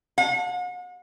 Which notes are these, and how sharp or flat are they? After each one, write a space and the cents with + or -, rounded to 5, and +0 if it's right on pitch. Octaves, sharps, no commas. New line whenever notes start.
F#5 -40